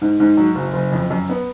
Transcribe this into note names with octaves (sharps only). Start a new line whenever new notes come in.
G#2
G#2
F#3
F#1
F#1
F2
F#2
B3